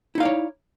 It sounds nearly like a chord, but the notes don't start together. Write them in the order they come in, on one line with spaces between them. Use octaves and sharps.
E4 D#4 F5 D5 C#5